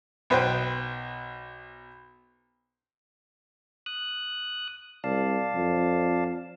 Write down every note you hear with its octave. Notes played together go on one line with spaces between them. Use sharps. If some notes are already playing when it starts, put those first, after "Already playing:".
B1 B4 C5 G5
D#6 F#6
C2 D5 F5 A5
F2